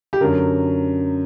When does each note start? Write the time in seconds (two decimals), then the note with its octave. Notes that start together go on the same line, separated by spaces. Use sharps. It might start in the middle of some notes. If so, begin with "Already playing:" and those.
0.13 G4
0.21 F#2 D3 A#4